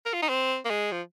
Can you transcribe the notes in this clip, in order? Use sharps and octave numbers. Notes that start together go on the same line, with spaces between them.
A#4
F4
D#4
C4
A#3
G#3
F3